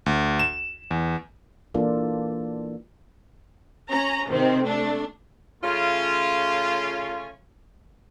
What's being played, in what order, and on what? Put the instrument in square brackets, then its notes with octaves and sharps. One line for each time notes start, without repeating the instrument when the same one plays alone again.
[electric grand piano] D2
E7
E2
[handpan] E3 A#3 D4 F4 A4
[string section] C#4 A#5
C3 D#3 C4
A3 D4
[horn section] C#3 A3 C#4 F4